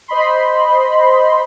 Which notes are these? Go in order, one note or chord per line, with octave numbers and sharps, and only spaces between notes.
C5 D#5 B5 C6